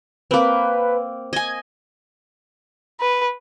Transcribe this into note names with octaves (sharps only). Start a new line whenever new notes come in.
A#3 C4 B4
D#5 G#5 G#6
B4